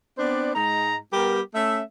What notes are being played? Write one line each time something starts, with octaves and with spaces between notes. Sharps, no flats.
B3 C4 D4 C5 D5
G#2 G#3 D#4 A#5
G3 B3 G4 A#4
A3 C#4 E5